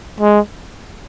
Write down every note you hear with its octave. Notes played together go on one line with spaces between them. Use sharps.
G#3